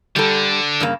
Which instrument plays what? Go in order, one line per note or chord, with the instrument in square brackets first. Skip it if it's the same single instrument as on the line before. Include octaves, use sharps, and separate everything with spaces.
[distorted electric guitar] D3 [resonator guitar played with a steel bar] G3 A4
[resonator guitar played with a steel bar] G2 C#3 A#3